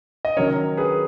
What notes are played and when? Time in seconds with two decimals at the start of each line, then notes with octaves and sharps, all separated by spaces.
0.25 D#5
0.37 D#3 F#3 C#4 A#4 C#5
0.77 G#4 B4